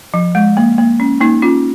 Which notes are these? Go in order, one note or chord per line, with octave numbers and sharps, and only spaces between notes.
F3
G#3
A#3
A#3
C#4
A#3 D#4
C#4 F4